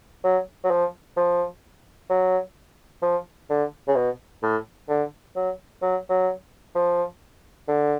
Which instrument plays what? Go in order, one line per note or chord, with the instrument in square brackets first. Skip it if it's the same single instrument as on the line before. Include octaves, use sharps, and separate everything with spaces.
[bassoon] F#3
F#3
F3
F3
F#3
F3
D3
C#3
B2
A2
D3
F#3
F#3
F#3
F3
D3